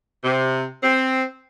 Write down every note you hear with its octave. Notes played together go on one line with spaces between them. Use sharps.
C3
C4